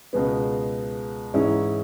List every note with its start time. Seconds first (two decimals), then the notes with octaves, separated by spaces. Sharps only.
0.13 C#2 B2 G#3 B3
1.33 G#2 E3 G#3 C#4 E4